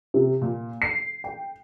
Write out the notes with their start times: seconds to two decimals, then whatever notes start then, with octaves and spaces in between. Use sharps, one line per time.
0.14 C3
0.42 A#2
0.82 C7
1.24 G5